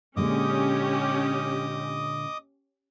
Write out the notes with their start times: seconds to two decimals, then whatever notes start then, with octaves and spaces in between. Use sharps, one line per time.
0.16 A#2 D3 G#3 C#4 G4 D#5 D6 D#6